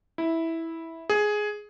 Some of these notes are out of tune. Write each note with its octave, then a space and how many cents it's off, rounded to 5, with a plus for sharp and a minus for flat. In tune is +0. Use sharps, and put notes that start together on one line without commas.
E4 -10
G#4 +10